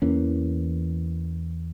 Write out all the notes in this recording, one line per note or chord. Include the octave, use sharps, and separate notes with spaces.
E2 E3 A#3 C#4